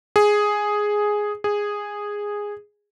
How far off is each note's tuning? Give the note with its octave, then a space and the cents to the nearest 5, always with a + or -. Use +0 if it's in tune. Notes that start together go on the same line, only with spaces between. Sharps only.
G#4 +0
G#4 -10